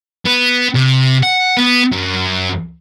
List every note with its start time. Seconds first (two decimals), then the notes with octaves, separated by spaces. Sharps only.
0.26 B3
0.75 C3
1.23 F#5
1.57 B3
1.92 F#2